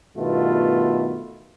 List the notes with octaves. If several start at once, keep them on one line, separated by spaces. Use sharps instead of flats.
G2 B2 D#3 A3 B3 F4